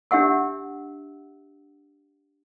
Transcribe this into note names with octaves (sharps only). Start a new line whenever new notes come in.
D4 G4 E5 F#5 E6